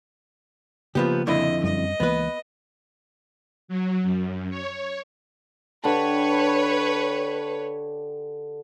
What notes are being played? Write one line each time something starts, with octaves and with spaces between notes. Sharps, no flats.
C#3 F3 A#3 B3 G4
F2 D3 E4 D#5
F#2 G3 C4 D#5
C#2 E3 A#3 B3 B4
F#3
F#2
C#5
D3 G4 B4 C#5 A5